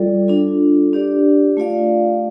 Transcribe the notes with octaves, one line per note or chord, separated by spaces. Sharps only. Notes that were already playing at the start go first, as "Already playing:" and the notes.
Already playing: G3 F4 A4 D5
D4 F4 A4
D4 G4 D5
A3 F4 D5 F5